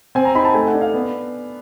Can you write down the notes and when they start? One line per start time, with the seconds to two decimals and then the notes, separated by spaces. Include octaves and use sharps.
0.15 C4 G#5
0.25 A#5
0.35 D#4 B5
0.45 A5
0.54 A3 G#5
0.67 F#5
0.74 D4
0.81 F5
0.94 B3